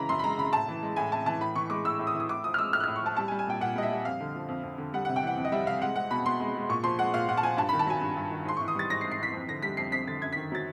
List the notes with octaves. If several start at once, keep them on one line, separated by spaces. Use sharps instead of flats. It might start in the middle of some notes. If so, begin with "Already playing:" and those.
Already playing: C#3 E3 G#3 A#5 B5
F#2 C6
B5
G#3 A#5
C#3 B5
A2 A5
E3
G#3
A2 G#5
A2 A5
E3 A5
A2 B5
E3 C#6
G#3 D6
A2 E6
A2
D#6
E3
D#6
A2 D6
F3 D#6
F6
G#3 E6
A2 F6
F#6
A2 F6
C#6
F3 A5
G3 A5
G#5
G3
G#5
A#2 G5
A#2 F#5
G3 D#5
E5
G3
F2 F5
D3
F3
F2
F2
D3
G3 F#5
C3 F#5
G5
E3 F#5
F2
D#5
G3 E5
C3 F5
G#3 F#5
G#3 F#5
B2 B5
B2 C6
G#3
G#3
A#2 C#6
F3 C6
G#3 F#5
A#2 F5
A#2 F#5
A5
F3 G#5
G2 A5
D#3 B5
A5
F#3 G#5
G2
G2
D#3
G#2 C6
E3 C#6
D#6
G3 A6
G#2 A#6
C7
G#2
C7
E3 B6
F2
D3 A#6
G3 B6
F2 C7
F2 B6
D3 A6
F#2 G#6
D#3 B6
F#3 A6